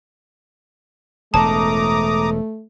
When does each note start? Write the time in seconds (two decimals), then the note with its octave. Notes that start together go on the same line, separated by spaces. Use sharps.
1.34 E1 A2 A3 A5 A#5 D6 D#6